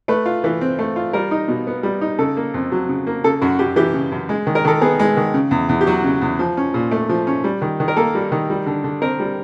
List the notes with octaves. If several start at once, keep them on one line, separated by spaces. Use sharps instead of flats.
A3 B4
F4
E3
C4
A3
F4
G3 A#4
D#4
B2
B3
G3
D#4
C#3 A4
A#3
F2
F#3
C#3
A#3
C#3 A4
F#2 F#4
F#2 G4
E3 G4
C#3
F#2
G#3
D#3
A#4
D#3 A4
B3 G#4
G#3
D#3
C#3
E2
E2
G4
F#3 F#4
C#3
E2
F3
C#4
A#2
A3
F3
C#4
G3
D#3
D#3
A#4
A#3 A4
G3
D#3
G3
D3
D3
C4 A#4
G3